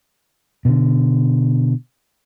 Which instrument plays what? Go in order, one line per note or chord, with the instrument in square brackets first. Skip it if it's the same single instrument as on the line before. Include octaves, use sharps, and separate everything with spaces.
[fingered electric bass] B2 D3